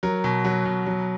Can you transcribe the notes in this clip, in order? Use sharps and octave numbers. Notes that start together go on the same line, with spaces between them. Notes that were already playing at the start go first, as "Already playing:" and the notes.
F#3 A#4
B2
F#3
B2
F#3